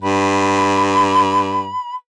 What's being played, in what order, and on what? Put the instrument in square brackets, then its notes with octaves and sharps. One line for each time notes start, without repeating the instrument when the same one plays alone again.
[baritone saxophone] G2 [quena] B5